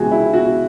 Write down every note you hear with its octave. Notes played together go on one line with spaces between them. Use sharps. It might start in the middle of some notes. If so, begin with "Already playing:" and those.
Already playing: C#2 C3 E3 F#4 G#4
E4
F#4